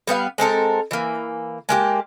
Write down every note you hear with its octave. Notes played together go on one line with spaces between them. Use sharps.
G3 B3 B4 F5
G#3 C4 A4 A#4
E3 A#3
G#3 A#3 G4